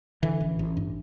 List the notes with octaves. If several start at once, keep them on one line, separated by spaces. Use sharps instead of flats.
D3 E3
A1
A1
G2